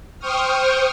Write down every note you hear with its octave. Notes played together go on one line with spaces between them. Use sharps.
C5 G5 C#6 D#6 F6